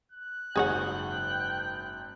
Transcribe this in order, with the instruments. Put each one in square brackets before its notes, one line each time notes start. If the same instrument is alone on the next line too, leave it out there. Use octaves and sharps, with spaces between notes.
[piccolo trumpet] F#6
[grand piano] F#1 G#2 F#3 [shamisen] G#4 C#5 F#5 [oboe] G5